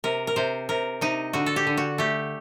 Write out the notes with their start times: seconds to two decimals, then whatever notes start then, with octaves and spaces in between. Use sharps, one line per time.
0.04 C3 A#4
0.27 A#4
0.36 C3 C5
0.69 C3 A#4
1.01 C3 D#4
1.33 D3 F#4
1.46 A4
1.56 G4
1.67 D3
1.77 F#4
1.98 A3 G4